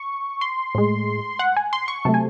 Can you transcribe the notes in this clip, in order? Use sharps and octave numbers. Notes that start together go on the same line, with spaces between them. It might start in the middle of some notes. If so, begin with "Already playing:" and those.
Already playing: C#6
C6
A2 G#3
F#5
G#5
C6
C#6
C3 F#3 A3 A5
G#5